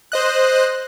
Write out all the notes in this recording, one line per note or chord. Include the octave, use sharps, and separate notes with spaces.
C5 D#5 F#6